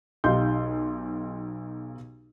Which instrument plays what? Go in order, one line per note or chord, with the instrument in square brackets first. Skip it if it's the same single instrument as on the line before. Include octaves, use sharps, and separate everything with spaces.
[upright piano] B1 D#4 G4 F5 C6 G6